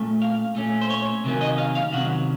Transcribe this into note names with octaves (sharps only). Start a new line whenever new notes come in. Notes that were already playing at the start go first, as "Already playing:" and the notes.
Already playing: A#2 A3 C#4
F5
A#2 A3 C#4
C5
C#5
C3 D#3 F#3 A#3 C#4
D#5
F5
F5
C3 D#3 F#3 C#4 F#5